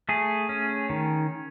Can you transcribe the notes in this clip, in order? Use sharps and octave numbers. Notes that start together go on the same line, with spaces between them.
A3 G#4
C#4
D#3